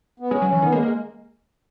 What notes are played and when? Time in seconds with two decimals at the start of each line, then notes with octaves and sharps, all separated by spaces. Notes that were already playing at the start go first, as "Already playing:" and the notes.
0.20 B3
0.31 G#3 C#4
0.42 F#3
0.47 E3 C#4
0.62 D#3 B3
0.72 G#3 A#3
0.83 G#3 A#3